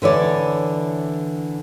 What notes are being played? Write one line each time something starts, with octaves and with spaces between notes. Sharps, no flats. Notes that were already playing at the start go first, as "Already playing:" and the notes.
D3 E3 C#5 D5